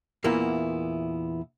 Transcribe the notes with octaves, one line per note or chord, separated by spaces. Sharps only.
E2 A#2 A#3 B3 E4